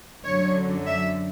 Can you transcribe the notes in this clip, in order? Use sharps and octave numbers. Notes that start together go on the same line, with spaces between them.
F#2 D3 F#3 C#5
E5